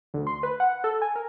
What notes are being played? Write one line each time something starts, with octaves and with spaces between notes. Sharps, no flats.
D2
C6
B4
F#5
A4
G#5
A#4